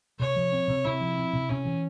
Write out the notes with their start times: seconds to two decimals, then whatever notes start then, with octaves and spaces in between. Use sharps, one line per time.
0.20 C3 C#5
0.36 F3
0.52 C4
0.68 C3
0.84 C3 E4
1.01 F3
1.17 C4
1.33 C3
1.49 C3 C#4
1.65 E3